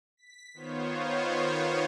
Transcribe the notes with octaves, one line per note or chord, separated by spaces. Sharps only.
B6
D#3 B3 F4 C5 C#5